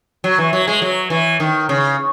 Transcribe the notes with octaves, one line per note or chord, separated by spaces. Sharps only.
F#3
E3
F#3
G#3
F#3
E3
D#3
C#3